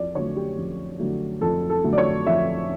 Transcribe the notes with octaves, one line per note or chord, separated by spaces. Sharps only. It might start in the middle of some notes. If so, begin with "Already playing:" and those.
Already playing: F2 D5
D3 F#3 A3 C#5
G4
F2
D3 F#3 A3
F2 A4
A4
D3 F#3 A3
D5
C#5
F2 E5